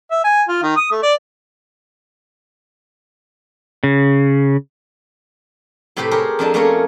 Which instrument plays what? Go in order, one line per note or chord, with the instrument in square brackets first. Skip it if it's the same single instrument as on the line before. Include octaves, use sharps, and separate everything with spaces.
[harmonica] E5
G#5
F4
D#3
D#6
A3
D5
[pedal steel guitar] C#3
[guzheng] A2 C3 C4 G4 B4 C5
G4 G#4 A#4 C5 C#5
F2 G#3 D4 G#4 A5
A3 A#3 C#4 G#4 A#4 C#5